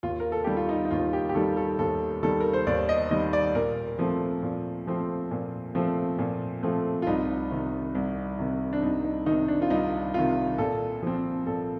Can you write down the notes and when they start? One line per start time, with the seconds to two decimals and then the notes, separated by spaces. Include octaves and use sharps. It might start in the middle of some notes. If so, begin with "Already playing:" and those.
0.03 D#2 F4
0.20 A#4
0.32 A4
0.44 D#3 G3 G4
0.57 F4
0.69 D#4
0.85 D#4
0.91 D#2 F4
1.13 G4
1.29 G4
1.35 D#3 G3 A4
1.57 A4
1.79 D#2 A4
2.23 D#3 G3 A4
2.40 A#4
2.53 C5
2.67 D#2 D5
2.89 D#5
3.11 D#3 G3 D#5
3.33 D5
3.55 A#2 A#4
3.99 F3 A3 C4
4.43 A#2
4.87 F3 A3 C4
5.31 A#2
5.75 F3 A3 C4
6.19 A#2
6.63 F3 A3 C4
7.02 F4
7.07 C2 D#4
7.51 C3 D#3
7.95 C2
8.39 C3 D#3
8.73 D4
8.82 C2 D#4
9.04 D#4
9.26 D#3 D#4
9.31 C3
9.48 D4
9.62 F4
9.70 C2 D#4
10.14 C3 D#3 F4
10.58 A#2 A4
11.02 F3 C4
11.46 A#2 A4